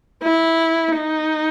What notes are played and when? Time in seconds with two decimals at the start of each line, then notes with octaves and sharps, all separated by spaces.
0.23 E4
0.97 D#4